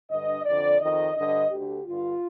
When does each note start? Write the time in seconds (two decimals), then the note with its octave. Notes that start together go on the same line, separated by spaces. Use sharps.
0.10 G2 D3 D#5
0.45 F2 D3 D5
0.80 F2 D#3 D#5
1.15 G2 D3 D#5
1.50 D2 D3 G4
1.85 G2 D3 F4